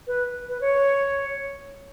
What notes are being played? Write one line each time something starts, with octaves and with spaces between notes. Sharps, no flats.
B4
B4
C#5